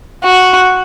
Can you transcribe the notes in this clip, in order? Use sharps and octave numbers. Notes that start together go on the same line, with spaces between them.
F#4